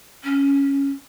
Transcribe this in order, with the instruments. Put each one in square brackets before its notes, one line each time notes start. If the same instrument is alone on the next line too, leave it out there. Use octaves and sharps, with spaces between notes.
[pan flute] C#4